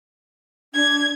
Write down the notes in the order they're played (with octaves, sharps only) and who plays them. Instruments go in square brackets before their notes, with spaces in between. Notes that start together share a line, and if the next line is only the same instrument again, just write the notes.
[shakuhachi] D4 [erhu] G#6